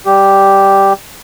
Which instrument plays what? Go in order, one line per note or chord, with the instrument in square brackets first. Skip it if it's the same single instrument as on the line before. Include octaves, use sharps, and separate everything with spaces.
[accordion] G3 G4